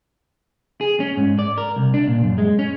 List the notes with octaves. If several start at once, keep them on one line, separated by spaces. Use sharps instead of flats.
G#4
C#4
G#2
D5
A#4
C2
D4
A#2
F#2
G#3
C#4